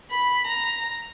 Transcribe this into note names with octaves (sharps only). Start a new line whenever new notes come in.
B5
A#5